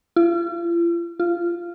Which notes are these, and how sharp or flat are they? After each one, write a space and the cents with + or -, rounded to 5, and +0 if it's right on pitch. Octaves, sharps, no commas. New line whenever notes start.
F4 -45
F4 -15